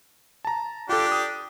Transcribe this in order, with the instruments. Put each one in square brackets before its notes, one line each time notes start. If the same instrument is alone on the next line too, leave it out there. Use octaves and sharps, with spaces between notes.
[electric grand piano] A5 A#5
[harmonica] D4 G4 [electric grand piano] F4 A4
[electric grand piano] D#6